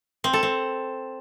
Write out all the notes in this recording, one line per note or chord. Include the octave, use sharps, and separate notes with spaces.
C4
A4
C4